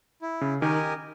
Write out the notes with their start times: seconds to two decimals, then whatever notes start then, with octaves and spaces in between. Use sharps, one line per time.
0.22 E4
0.41 C#3
0.61 D#3 G4 A#4 D#5 G#5